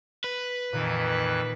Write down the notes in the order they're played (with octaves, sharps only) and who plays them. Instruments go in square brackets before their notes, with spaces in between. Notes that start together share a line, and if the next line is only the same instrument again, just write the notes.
[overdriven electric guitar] B4
[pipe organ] F2 E3 F#6 [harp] A#2 D#3